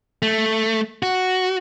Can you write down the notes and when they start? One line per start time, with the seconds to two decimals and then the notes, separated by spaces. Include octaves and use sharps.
0.22 A3
1.03 F#4